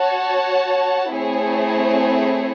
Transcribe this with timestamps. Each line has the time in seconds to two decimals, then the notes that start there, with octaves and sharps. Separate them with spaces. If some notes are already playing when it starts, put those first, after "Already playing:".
Already playing: F#4 C#5 F#5 A5
1.12 A3 C4 E4 G#4 C#5